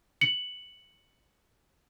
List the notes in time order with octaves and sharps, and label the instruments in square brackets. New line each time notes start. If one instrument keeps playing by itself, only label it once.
[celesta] C#7 F#7